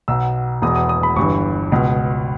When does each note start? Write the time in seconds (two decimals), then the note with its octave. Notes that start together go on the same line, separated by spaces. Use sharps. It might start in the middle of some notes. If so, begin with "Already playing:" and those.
0.08 B1 B2 E6
0.62 E1 E2 B2 D#6
0.76 D#6
0.89 D#6
1.03 B5
1.16 G1 G2 E3 C#6
1.72 C#2 B2